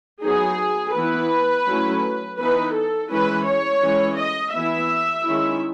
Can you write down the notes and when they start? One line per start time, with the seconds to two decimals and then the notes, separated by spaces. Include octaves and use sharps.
0.23 F#3 B3 D#4 G#4
0.95 E3 B3 E4 B4
1.67 F#3 A3 C#4 E4
2.39 E3 B3 D#4 B4
2.75 A4
3.11 E3 G#3 C#4 E4 B4
3.46 C#5
3.82 E3 G#3 C#4 E4
4.19 D#5
4.54 E3 B3 E4 E5
5.27 D#3 G#3 C#4 E4